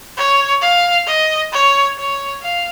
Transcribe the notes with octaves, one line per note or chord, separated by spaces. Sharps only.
C#5
F5
D#5
C#5
C#5
F5